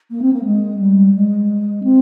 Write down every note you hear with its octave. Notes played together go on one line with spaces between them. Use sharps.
A#3
C4
A#3
G#3
G3
G#3
C4